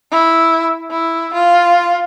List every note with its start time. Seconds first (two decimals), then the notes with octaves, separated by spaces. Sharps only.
0.11 E4
0.90 E4
1.34 F4